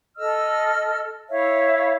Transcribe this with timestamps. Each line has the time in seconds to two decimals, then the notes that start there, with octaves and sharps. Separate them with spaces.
0.18 A4 D#5 E6 F6
1.30 E4 C#5 E5 F5